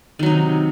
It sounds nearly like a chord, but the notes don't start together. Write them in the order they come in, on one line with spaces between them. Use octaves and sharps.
D#3 F#3 D#4 C3